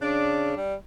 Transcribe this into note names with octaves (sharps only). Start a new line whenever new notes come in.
C#3 D4
G3